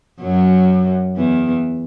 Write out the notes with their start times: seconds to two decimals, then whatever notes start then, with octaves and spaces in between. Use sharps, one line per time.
0.21 F#2 F#3
1.17 E2 E3